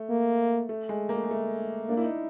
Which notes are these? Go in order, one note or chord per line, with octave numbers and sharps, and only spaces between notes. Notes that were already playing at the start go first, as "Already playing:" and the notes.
Already playing: A3
A#3
A3
G#3
A#3
A3
G#3
A3
A#3 D4
E4
D#4